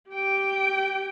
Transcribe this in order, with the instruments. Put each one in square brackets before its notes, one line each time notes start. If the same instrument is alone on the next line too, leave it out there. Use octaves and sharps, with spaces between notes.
[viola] G4 G5